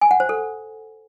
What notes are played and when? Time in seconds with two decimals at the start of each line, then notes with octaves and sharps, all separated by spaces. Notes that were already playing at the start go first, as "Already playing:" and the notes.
0.01 G#5
0.11 F#5
0.20 C5
0.29 A4